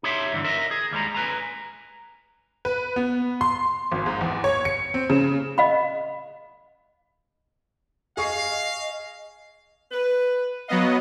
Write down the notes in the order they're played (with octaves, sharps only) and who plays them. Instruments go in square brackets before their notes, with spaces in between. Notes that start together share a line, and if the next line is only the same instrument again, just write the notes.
[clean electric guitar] D#4 G4 C#5 E5 C6
E2 G2 D3 E3
A#4 D#5 E5
G#4
D#2 G3 G#3 A#5
B4 G#5 A#5
[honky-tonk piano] B4
B3
C6
G#1
G#2
E2
C#5
C#7
C4
C#3
[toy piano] D#5 F5 B5
[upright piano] G#4 C#6 C7 [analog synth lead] D#5 [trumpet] F5
[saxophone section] B4
[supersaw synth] F#3 B3 D#5 [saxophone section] B4 F5 F#5